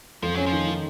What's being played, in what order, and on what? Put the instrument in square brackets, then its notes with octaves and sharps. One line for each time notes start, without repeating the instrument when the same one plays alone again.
[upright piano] F2 [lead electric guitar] F3
[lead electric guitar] F#3 [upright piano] C#4
[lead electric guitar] F3
[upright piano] D#3
D#3